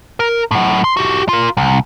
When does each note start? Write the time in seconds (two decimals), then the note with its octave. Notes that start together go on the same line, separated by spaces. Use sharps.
0.20 A#4
0.51 A2 F#3
0.84 C6
0.97 F#4 G4
1.29 F4 A#4
1.57 C2